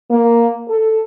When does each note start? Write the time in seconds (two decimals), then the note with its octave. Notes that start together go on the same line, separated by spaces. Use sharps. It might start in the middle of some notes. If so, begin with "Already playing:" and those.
0.11 A#3
0.69 A4